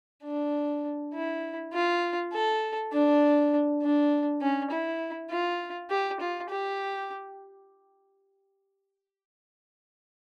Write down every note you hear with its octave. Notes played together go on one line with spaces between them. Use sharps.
D4
E4
F4
A4
D4
D4
C#4
E4
F4
G4
F4
G4